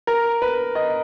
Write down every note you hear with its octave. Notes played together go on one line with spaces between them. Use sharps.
A#4
B4
D#5